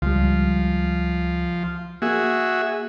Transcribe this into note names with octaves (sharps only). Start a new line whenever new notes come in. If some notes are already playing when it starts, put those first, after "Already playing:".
C#2 F3 G3
A#3 F#4 G#4 E5